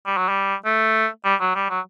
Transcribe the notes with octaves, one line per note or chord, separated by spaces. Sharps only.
G3
F#3
G3
A3
G3
F#3
G3
F#3